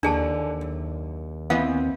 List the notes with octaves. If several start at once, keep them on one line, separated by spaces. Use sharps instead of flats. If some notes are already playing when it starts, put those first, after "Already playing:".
D#2 D3 E3 D4 G#4 A5
F#2
E3 B3 C4 D#5 F5